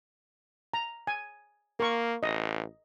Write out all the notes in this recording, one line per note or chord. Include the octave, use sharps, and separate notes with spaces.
A#5
G#5
A#3 A#4 C#6
A1 D#5